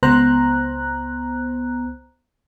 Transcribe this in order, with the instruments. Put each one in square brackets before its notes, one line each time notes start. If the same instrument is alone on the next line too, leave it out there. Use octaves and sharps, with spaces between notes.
[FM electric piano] C#2 B3 C5 A#5 F#6